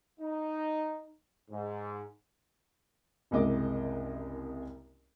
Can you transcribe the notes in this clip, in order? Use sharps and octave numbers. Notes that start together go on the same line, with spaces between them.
D#4
G#2
F#1 C2 G#3 D#5 D6